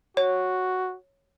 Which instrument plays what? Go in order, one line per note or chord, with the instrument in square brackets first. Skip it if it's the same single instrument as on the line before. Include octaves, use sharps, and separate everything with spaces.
[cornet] F#4 [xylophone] C#5